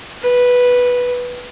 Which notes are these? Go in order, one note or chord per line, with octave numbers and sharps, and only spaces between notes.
B4